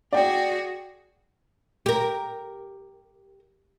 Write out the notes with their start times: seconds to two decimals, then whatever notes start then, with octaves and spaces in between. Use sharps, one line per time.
0.13 F#4 G#4 D5 G5
1.86 G4 A#4